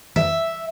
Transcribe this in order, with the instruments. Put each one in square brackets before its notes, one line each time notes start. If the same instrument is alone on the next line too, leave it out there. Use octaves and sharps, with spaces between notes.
[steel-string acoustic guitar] E5